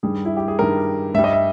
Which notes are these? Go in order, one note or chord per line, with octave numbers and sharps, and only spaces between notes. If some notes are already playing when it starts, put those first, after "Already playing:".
G2 D#3 G3 G#4
E4
G4
G#4
G2 D#3 G3 A#4
G2 G3 E5
D#5
E5